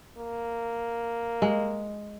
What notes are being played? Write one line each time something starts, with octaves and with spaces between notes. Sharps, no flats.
A#3
G#3